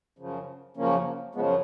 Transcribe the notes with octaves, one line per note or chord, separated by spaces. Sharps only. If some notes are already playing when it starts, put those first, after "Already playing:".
F#2 C#3 F3
F#2 C#3 F3 A#3 C#4
F#2 C#3 F3 G#3 B3